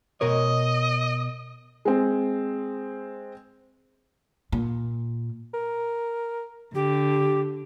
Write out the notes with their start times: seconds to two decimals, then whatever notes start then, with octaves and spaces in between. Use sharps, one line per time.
0.21 B2 A#4 C#5 D#5
1.85 G#3 C4
4.52 A#2
5.54 A#4
6.74 D3 G4